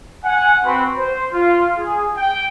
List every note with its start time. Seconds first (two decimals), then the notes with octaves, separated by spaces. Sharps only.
0.24 F#5 G#5
0.65 C4 F#4 B4 B5 C6
0.97 C5
1.33 F4
1.78 G#4
2.17 G5